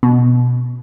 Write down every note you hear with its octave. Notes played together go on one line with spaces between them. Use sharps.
B2